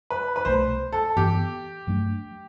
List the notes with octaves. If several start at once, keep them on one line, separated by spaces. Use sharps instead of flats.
B4
B4
C2 B2 A3 C5
A4
G2 E3 B3 G4
G2 F#3 A3 D4